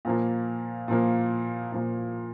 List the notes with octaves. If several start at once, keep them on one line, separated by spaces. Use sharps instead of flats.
A#2 F3 A#3
A#2 F3 A#3
A#2 F3 A#3